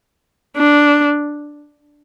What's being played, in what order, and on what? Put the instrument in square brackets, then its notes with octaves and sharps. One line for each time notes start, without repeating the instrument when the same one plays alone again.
[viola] D4